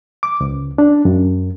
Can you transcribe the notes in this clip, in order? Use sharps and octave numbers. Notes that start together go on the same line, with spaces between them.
D6
C#2
D4
F#2